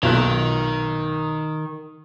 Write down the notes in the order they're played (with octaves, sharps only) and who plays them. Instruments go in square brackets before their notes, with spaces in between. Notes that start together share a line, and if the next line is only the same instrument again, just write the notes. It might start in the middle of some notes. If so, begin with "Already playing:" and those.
[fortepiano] B1 A#2 F#6 [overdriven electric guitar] D#3